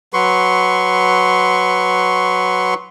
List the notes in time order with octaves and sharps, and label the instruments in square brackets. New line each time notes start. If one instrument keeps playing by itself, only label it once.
[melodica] F#3 B4 C6 C#6